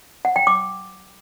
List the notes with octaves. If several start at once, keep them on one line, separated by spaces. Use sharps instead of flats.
F#5
G5
D6